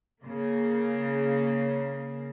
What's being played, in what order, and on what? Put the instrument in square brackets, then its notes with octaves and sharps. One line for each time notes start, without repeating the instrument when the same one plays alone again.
[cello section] C#3 A#3